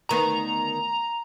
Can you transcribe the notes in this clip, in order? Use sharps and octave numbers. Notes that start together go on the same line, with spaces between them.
D2 D#3 B3 A#5